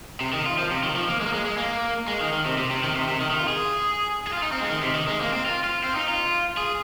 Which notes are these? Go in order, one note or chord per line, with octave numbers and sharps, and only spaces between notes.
C3
D#3
F4
F3
C3
D#3
F3
A#3
G#3
A#3
G#3
G#3
A#3
G#3
D#3
D#3
C3
C3
C3
D#3
C3
C3
D#3
D#3
F4
G#4
G#4
F4
D#4
C4
G#3
D#3
C3
D#3
G#3
A#3
C4
F4
F4
C4
D#4
F4
G#4